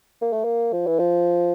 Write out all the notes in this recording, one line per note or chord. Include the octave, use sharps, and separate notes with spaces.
A#3
A3
A#3
F3
E3
F3